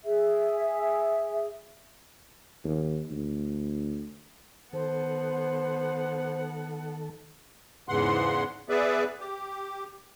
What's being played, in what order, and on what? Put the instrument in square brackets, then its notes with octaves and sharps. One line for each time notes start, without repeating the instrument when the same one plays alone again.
[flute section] G#4 E5
[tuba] D#2
D2
[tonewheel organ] D#3 A4 [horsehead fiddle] B3 F#5 [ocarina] C5
[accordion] E2 G#2 C#3 E3 F#5 C6
B3 G#4 B4 D5 E5
G4